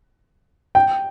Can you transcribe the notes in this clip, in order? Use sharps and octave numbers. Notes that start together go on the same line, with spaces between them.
G5